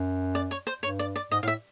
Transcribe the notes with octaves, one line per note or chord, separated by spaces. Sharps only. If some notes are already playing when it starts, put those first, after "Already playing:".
Already playing: F#2
D5
C#5
C5
G2 C#5
D5
D5
G#2 D#5
A2 E5 F5